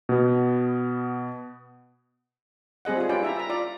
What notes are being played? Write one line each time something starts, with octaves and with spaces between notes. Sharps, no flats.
B2 B3
G3 C4 G#4 D#5 F#5
F4 G#4
C#4 F4 G4 B4 D5 G5
E4 E5 A#5
E5 A#5
F4 D5 A#5